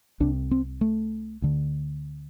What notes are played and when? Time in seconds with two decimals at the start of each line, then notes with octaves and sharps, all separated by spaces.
0.20 C2 C3 D4
0.51 C4
0.81 A3
1.42 D2 D3